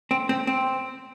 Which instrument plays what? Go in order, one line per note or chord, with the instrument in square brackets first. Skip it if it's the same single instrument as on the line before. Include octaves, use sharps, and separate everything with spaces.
[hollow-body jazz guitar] C4
C4
C4